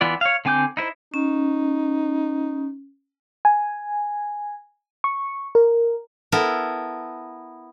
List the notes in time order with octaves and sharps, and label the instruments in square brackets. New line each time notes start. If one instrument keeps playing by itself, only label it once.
[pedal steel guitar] E3 B3 F4 D5
C#5 F5
D3 C4 G#5 D6 G6
D#4 E4 C5
[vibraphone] C#4 [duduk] D#4
[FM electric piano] G#5
C#6
A#4
[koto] B3 E4 A4 A#4